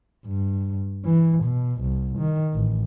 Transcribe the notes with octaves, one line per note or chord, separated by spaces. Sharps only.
G2
E3
B2
C2
D#3
A1